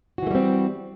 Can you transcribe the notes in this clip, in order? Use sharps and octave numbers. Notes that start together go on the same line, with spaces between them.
E3 G3 A3 C4 F#4